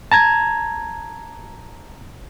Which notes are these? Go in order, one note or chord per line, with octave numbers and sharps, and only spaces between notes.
A5 A#5 G#6